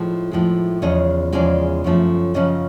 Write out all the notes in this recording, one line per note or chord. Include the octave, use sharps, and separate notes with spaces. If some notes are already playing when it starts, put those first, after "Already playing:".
Already playing: A2 F3 G#3
A2 F3 G#3
E2 C#3 F3 G#3 C#5 D#5
E2 C#3 F3 G#3 C5 D5
F#2 C#3 F3 A3
F#2 C#3 F3 D#5